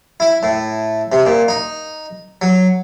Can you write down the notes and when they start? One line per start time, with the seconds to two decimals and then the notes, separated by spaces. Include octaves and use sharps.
0.20 E4
0.43 A2
1.12 C3
1.25 A#2
1.48 D#4
2.42 F#3